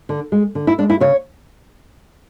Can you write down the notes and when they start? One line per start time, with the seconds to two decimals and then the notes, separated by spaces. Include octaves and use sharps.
0.09 D3
0.32 G#3
0.55 D3
0.67 E4
0.78 G#3 D4
0.90 E4
1.00 C#3 C#5